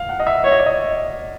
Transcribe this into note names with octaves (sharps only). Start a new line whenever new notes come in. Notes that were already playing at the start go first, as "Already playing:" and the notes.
Already playing: F5
F#5
D#5
E5
C#5 E5
D#5
D5
D#5